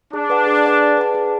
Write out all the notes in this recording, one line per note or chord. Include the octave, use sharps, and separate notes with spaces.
D4 G#4
B4 D5 F#5 A5
G#4
B4 D5 F#5 A5
G#4
B4 D5 F#5 A5
G#4